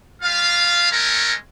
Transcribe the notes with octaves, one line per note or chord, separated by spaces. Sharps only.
G3 F4 F5
G#3 A3 C#4 A#4